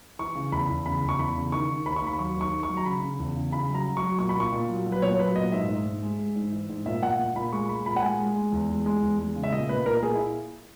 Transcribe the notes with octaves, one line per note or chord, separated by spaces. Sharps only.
E3 C#6
C#3
E2 B5
E2
C#3 B5
E2
C#6
E2 B5
C#3
D#3 C#6
D#3
D#2 B5
C#6
D#2 B5
F#3 C#6
D#2 C#6
D#3
C#6
F#3
A#5
C#3 B5
C#3
E2
C#3
C#3 B5
F#3
A#5
F#3
C#6
F#3
A#2 C#6
B5
A#2 C#6
A#2
F#3
F#3
B4
A#2 C#5
C#5
F#3 B4
A#2 D#5
G#2 E5
G#2
G#2
G#3
G#3
G#2
E3
G#2
A#2 E5
A#2 F#5
A#2
A#2 B5
G#3 C#6
G#3 B5
A#2 B5
F#5
G#3 G#5
G#3
G#3
E2
G#3
G#3
E2
G#3
C#3
E5
A#2 D#5
A#2 B4
A#2 A#4
A#4
A#2 G#4
E4